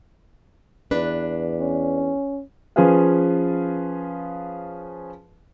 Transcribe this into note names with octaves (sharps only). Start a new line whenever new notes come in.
E2 D4 B4
C#4
F3 C#4 F4 G#4 B4 F5